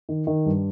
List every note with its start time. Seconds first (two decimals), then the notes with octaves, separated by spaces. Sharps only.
0.09 D#3
0.27 D#3
0.46 G2